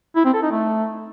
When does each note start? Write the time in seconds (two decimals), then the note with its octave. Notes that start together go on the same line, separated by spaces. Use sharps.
0.16 E4
0.25 C4
0.34 A4
0.43 D#4
0.52 A3